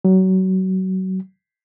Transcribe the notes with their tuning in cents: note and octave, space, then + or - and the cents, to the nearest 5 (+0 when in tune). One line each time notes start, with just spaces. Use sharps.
F#3 +25